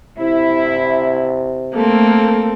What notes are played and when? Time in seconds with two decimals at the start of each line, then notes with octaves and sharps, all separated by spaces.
0.19 C3 E4
1.75 A3 A#3 C4 A4